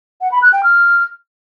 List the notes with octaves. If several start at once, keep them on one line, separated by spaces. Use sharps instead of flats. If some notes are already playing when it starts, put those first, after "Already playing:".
F#5
B5
F#6
G5
F6